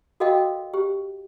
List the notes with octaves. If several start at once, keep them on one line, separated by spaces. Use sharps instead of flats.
F#4 A4 A#4 D#5 F5 G5
G4